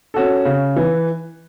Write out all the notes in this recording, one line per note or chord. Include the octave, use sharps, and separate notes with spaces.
C#4 F#4 A4
C#3
E3